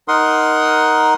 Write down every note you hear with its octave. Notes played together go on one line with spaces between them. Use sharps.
D#4 A#4 F#5 C6 D#6